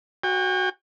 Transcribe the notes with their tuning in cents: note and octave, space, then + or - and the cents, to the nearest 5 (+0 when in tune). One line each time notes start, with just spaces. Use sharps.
F#4 +0 G5 +40